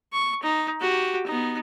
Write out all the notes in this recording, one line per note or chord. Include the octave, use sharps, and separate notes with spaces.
C#6
D#4
F#4 G4
B3 D#4